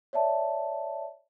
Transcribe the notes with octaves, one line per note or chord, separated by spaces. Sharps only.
C#5 D5 E5 A5